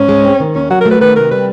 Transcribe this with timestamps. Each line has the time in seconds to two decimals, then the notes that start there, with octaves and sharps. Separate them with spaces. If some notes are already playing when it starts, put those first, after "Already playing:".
Already playing: G#2 C#4
0.09 G#3
0.24 C4
0.40 D#3
0.55 D#2 C#4
0.70 F#3 F#4
0.80 A#4
0.86 A3
0.91 B4
1.01 D#3 B4
1.16 C3 A#4
1.31 G3 B4